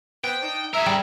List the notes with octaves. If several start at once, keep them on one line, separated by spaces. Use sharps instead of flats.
B3 C4 C5 G5
D4 D#4
G#4 A#4 E5
G3